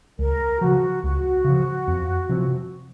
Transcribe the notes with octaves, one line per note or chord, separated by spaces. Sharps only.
C#2 A#4
C#3 F3 F#4
C#2 F#4
C#3 F3
F2
C3 F3 C4